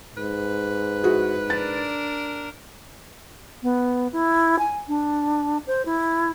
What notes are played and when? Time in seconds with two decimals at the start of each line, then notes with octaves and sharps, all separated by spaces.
0.17 G#2 B4
1.04 E4 F#4 G#4
1.50 D4 A#4 A6
3.63 B3
4.13 E4
4.59 G#5
4.88 D4
5.67 C5
5.86 E4